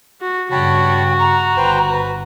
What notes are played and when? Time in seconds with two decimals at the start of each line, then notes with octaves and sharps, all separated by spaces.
0.21 F#4
0.51 G2 C#3 F#4 C#5 G5 A5 B5
1.19 A#5 C#6
1.57 G1 B4 C5 G5
1.91 B4